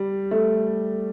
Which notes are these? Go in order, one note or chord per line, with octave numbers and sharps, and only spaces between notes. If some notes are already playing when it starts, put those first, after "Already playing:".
Already playing: G3
A3